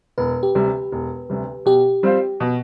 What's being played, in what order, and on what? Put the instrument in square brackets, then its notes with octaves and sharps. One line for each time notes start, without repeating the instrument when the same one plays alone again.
[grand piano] E1 [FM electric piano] B4
[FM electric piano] G4
[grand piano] D2 C3 G3
E1
D2 C3 G3
[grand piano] B2 [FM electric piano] G4
[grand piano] G3 C4 F4 C5
B2